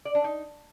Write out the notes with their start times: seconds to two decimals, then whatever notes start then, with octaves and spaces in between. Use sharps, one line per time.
0.05 D5
0.15 D4
0.24 D#4